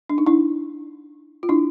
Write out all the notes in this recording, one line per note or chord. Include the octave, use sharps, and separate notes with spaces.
D4
D#4
D4 E4
F4
D4 E4